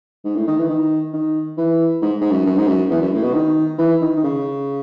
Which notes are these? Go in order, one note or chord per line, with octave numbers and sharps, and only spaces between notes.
G#2
A2
D#3
E3
D#3
D#3
E3
G#2
G#2
F#2
F#2
G#2
F#2
E2
F#2
A2
B2
D#3
E3
D#3
D#3
C#3